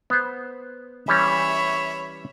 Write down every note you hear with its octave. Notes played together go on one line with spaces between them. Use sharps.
B3 C5
E3 G3 C#4 C#5 E5 B5